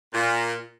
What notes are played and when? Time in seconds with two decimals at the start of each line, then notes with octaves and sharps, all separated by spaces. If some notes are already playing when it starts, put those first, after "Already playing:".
0.14 A#2